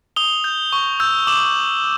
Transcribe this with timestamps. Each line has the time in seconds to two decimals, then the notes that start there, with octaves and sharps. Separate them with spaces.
0.16 D#6 F7 G7
0.44 G6
0.73 C#6
1.00 E6 G6
1.27 D6 E7 F#7